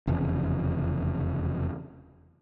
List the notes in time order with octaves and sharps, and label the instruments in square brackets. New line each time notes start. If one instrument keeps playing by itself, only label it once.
[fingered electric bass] F1 E2 C#3